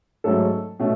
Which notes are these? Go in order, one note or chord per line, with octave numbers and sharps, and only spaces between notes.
G#2 F#3 A3 C#4 A4
B2 A3 C#4